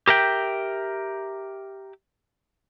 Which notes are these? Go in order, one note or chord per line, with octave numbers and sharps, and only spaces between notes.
G4 A#4 E5 G5